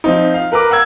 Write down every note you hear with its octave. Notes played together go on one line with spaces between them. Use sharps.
F3 C4 D#4
F5
A#4 B4 A#5 D6
F5 F#5 E6 G#6